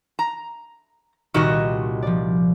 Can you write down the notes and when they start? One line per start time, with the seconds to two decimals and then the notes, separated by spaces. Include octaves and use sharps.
0.19 A#5
1.34 C2 A#2 D#3 F#4 D#5 E7
2.02 F3 D5